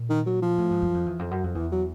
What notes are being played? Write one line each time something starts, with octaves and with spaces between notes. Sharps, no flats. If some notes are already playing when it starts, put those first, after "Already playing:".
Already playing: A#2
D#3
F#3
F3
A2
G#2
F#2
F2
E2
F2
F#2
F2
E2 E3
F#3